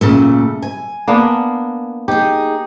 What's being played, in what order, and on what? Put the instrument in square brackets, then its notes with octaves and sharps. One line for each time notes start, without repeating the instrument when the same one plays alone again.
[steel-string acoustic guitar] A#2 C#3 A3
G#5
[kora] A#3 B3 D4
[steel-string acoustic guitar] D#4 G#4 [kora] G4